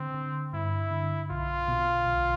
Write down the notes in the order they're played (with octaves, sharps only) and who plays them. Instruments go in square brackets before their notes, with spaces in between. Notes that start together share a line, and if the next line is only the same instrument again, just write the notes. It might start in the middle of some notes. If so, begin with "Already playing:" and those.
Already playing: [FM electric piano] D3 [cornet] C4
[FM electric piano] D3
[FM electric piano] G2 [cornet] E4
[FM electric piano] D3
[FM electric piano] B1 [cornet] F4
[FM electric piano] B2
B1